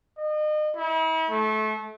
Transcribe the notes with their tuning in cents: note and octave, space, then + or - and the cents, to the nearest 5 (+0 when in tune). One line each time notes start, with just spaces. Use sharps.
D#5 -35
E4 -40
A3 -25